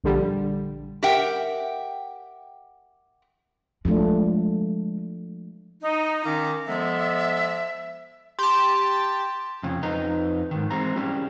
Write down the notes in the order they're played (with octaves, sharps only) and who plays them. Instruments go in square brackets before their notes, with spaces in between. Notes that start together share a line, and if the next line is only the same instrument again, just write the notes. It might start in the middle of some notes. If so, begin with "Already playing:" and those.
[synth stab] A#1 D3 G3
[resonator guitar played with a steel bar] G4 A#4 E5 F#5 G5
[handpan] F3 A3 D4 [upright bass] G#3
[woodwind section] D#4
D#3 C#4 F5 A#5 D6
F3 G#3 B3 A4 E5
[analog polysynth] G4 A5 [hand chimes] C6
[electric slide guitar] F2 C#3
F2 D#4 B4 D#5 A#5
G#2 D#3
E3 G#3 C4 A#5
G3 C#4 E4 G4